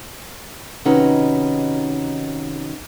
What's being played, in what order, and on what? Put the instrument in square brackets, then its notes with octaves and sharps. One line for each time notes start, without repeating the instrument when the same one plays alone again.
[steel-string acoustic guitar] C3 D#3 C#4 D#4 F#4 B4